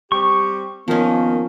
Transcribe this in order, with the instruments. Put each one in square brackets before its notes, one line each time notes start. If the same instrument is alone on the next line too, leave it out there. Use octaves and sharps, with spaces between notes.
[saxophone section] G3 C4 G4 [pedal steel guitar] C#6
[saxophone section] D#3 A#3 [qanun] F3 C#4 [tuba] B3